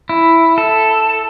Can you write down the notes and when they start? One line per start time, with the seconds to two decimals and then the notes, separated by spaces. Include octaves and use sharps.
0.09 E4
0.58 A4